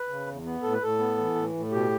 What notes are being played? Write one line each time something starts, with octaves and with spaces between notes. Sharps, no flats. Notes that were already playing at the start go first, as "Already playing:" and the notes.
Already playing: B4
C#3
E2
B3
A2 A4
B4
A2 A4
B3
E3
A2
A2
B2 G4